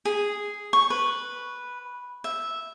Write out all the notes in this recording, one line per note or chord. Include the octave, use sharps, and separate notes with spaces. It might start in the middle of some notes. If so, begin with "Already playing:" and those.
G#4
C#6
B4
E5